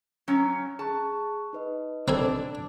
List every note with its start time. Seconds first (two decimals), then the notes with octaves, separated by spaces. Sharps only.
0.28 F#3 C#4
0.79 G#4 A5 C#6 F#6
1.53 D#4 B4 D#5
2.08 C4 D4 A4 G#5